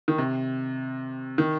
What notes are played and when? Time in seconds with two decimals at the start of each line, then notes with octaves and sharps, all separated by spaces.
0.08 D#3
0.18 C3
1.38 D#3